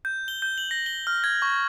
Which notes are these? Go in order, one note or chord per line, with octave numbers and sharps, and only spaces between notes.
G6
G7
G6
F#7
A#6
G7
F6
G#6
C#6